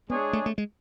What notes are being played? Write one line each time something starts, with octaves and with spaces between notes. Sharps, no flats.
G#3 B3 D4 G#4 C#5
A3
A3
G#3